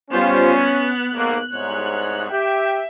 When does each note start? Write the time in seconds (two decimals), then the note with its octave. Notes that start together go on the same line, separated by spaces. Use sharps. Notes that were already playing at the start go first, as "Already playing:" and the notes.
0.11 G3 B3 C#4 F4 C5
0.60 F#6
1.14 B1 G#2 A#3
1.53 C2 G#2 C#5
2.31 G4 E5 G5